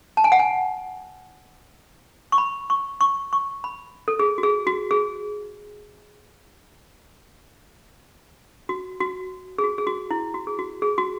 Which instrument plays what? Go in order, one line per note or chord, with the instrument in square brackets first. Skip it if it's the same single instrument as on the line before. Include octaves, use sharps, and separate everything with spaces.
[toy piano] A5
G#5
F#5
G#5
C#6
B5
C#6
C#6
C#6
B5
A4
G#4
F#4
G#4
F#4
G#4
F#4
F#4
G#4
F#4
G#4
F#4
E4
F#4
G#4
F#4
G#4
F#4